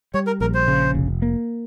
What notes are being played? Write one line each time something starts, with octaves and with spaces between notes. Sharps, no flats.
G3 C#5
A#4
A#1 A#4
C5
C#3
F1
A#3